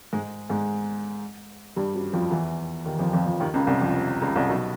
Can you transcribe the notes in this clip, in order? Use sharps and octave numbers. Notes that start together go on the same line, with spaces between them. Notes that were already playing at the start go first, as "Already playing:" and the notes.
G#2 G#3
G#2 G#3
G2 G3
F#2 F#3
F2 F3
E2 E3
D#2 D#3
F2 F3
F2 F3
F2 F3
D#2 D#3
C#2 C#3
C2 C3
F2 F3
C#2 C#3
C2 C3
B1 B2